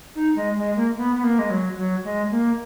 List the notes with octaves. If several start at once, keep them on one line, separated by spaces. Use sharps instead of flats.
D#4
G#3
G#3
A#3
B3
B3
A#3
G#3
F#3
F#3
G#3
A#3